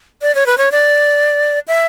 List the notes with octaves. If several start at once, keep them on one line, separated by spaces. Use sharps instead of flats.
D5
C#5
B4
C#5
D5
E5